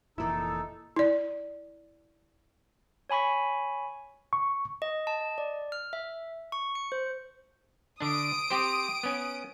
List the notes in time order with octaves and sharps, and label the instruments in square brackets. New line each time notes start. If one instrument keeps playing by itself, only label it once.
[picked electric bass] F1 A#2 E3 [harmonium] D#4 A4 [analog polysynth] E4 E6
[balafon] E4 D5
[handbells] C#5 G#5 B5 C#6 B6
[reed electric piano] C#6
[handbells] D#5
A5
D#5
D5
F6
E5
C#6
C#7
C5
[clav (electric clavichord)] D3 D4 [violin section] D#6 D7
[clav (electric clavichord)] C4 G4 C5
B3 C#4